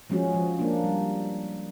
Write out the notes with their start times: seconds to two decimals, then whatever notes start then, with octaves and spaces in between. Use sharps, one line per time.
0.10 F3 G#3 C#4 F#4
0.34 F3
0.59 A#3 D4
0.84 G3